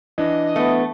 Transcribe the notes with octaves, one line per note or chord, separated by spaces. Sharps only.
E3 D4 D#5
A3 B3